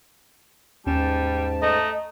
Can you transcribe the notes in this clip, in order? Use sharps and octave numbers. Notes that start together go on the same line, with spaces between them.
D#2 G#2 G3 C#4 A5 E7
A3 D#5 A#5